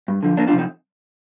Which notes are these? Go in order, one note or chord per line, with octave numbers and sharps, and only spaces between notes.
G2
D3 F3
F2 A#3 D4
D4 F4
C3 F3 C4 D#4